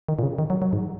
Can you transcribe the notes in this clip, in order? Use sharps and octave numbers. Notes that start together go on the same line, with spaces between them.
D#3
A#2
C#3
D#3
F#3
F#3
G#2